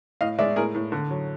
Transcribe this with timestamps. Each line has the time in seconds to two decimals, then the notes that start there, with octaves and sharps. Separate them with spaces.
0.21 A2 D#5 F5
0.39 G#3 D5 E5
0.56 A2 G#4 A#4
0.75 A2
0.92 D3
1.11 F#3